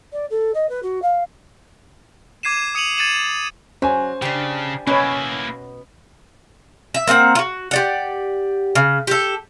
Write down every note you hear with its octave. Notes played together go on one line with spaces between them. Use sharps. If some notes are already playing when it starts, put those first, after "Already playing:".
D5
A4
D#5
B4
F#4
F5
D6 G#6 C7 D#7 E7
D#6 C#7 D#7 F7 F#7
G#6 A6 C#7 D#7 E7 F#7
F#3 C#4 C5 G#5
C#3 D4 G4
B2 A#3 B3 C#4 E4 C#5
E5
A#3 C4 D#5 F#5
F4 F#4
G4 D5 F#5
C#3
G4 A4